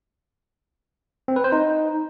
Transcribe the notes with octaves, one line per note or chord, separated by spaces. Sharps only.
C4
B4
C5
D#4